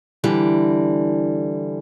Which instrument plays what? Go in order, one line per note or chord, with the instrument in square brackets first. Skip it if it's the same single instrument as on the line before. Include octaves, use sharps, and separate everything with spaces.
[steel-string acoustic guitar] D3 E3 G3